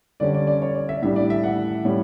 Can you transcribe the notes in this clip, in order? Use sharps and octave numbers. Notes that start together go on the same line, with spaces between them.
D3 G3 C#4 D5
D5
D5
C#5
D5
E5
A2 G3 D4 E5
D5
E5
F#5
A2 G3 C#4